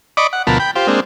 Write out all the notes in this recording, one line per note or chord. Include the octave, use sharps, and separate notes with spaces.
D5 D#5 B5 C#6 D6
F#5
D2 B2 F3 A#4 A5 B5
G5 B5
F4 G4 C5
G#3 A#3 C4 D4